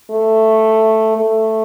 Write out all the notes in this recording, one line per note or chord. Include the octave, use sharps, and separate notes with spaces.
A3
A3